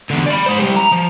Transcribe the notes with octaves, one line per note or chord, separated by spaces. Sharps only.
E2 D3
D5 B5
G#3 C5
C3 G3
A#5
F3